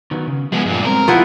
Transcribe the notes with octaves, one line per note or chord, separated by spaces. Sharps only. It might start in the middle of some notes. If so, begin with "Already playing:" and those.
D#3 F#3 B3
C#3
F3 G#3 B3 G#4
G2 A#2
G#3 B3 C4 A#4
F3 G3 B3 E4